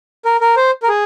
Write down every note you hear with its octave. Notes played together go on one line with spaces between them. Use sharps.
A#4
A#4
C5
A#4
G#4